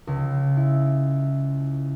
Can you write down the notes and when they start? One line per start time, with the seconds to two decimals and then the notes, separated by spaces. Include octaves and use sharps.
0.07 C#2
0.57 E4